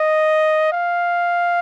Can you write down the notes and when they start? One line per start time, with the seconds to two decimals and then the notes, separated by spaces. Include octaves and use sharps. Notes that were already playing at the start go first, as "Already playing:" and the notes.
Already playing: D#5
0.72 F5